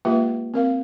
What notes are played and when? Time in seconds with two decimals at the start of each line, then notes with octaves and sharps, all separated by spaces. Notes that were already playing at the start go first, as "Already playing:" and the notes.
0.05 G#3 A#3 F4 G4 B4 E5
0.54 C4 A#4 F5